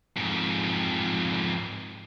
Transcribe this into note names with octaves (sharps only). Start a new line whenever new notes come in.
F2 G#2